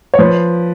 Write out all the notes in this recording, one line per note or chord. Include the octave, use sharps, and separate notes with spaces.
C#5
F3 B4